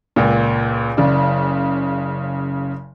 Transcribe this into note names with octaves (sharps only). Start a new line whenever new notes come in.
C#2 A#2
F#1 C#3 D5